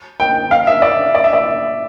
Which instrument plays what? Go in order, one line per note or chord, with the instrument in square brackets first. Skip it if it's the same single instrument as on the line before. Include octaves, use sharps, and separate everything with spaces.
[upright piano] G5
F5
E5
D5
D5
E5
D5